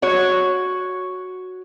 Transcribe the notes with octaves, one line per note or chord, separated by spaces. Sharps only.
F#4 C#5